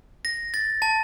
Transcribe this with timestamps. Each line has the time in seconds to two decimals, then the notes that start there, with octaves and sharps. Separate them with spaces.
0.25 A#6
0.54 A6
0.82 A5